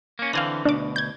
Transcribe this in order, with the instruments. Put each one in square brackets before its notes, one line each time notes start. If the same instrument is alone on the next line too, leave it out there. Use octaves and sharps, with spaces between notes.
[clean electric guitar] A#3 C#4
[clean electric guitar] D3 E3 C4 [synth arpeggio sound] F5 G#5 A#6
[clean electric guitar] D2 B2 [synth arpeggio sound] D4 D6
[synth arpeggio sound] G6 G#6